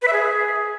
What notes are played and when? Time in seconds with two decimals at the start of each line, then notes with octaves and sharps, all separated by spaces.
0.02 B4
0.08 E5
0.13 G#4